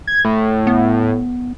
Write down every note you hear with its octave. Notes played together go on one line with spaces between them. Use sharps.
G#6
A2
B3